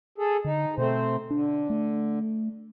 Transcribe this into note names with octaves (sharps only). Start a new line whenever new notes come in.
G#4 A4
D3 D#4
B2 A3 C4 C5
D3 D4
A3